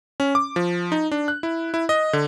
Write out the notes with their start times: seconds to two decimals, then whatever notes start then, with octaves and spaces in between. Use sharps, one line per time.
0.20 C#4
0.35 D6
0.56 F3
0.92 D#4
1.12 D4
1.28 F#6
1.43 E4
1.74 E4
1.89 D#5
2.13 D3